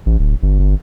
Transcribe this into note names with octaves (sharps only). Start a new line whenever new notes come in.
A1
D1
G1
G1